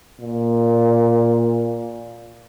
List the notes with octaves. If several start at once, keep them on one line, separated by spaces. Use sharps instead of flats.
A#2